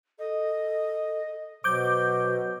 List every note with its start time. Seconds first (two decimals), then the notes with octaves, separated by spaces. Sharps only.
0.19 A4 D#5
1.64 B2 F#3 C5 D6 G6